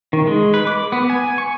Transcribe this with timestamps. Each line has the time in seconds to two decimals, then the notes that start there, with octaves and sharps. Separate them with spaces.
0.13 D#3
0.27 G#3
0.54 B4
0.67 D6
0.92 B3
1.10 G#5
1.38 C#6